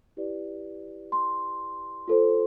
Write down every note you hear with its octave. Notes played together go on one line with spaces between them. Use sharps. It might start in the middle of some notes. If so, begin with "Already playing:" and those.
E4 G4 B4 D5
C6
F4 A4 C5